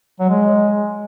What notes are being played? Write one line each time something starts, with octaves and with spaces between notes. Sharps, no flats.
F#3
G#3